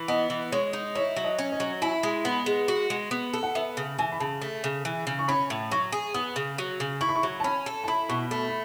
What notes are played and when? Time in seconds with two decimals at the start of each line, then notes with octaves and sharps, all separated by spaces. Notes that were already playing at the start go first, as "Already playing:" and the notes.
Already playing: E3
0.08 B3 D#5
0.30 E3
0.52 G#3 C#5
0.73 D#4
0.95 E4 C#5
1.16 F#3
1.24 D#5
1.38 C#4
1.52 D#5
1.60 F#3
1.82 E4 G#5
2.03 G#3
2.25 B3 B5
2.46 G#3
2.68 F#4
2.90 G#3
3.11 B3
3.33 A4
3.43 F#5
3.55 B3 E5
3.77 C#3
3.99 E3 G#5
4.12 B5
4.20 C#3 A5
4.41 A3
4.64 C#3
4.85 E3
5.07 C#3
5.19 C#6
5.28 C#4 B5
5.50 A2
5.71 F#3 C#6
5.92 G#4
6.14 B3 D#6
6.36 C#3
6.58 F#3
6.80 C#3
7.01 E4 C#6
7.09 B5
7.16 C#6
7.23 F#3
7.40 A5
7.44 C#4 B5
7.66 A4
7.84 A5
7.88 E4 B5
8.09 B2 C#6
8.31 A3 B5
8.48 B5